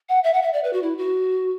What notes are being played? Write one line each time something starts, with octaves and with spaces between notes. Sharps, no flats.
F#5
E5
F#5
E5
D5
B4
F#4
E4
F#4